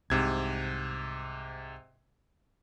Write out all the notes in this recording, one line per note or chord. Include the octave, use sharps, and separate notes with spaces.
C2 G#2 C3 G#6